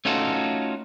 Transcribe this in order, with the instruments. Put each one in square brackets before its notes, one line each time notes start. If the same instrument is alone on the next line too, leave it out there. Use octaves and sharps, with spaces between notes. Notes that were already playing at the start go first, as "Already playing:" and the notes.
[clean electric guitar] A3 C#4 D#4 F4 F#4 A4